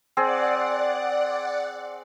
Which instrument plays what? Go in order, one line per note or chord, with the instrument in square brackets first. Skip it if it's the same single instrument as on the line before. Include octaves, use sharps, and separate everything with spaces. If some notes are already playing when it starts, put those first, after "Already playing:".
[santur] C4 G#4 [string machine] D5 F#5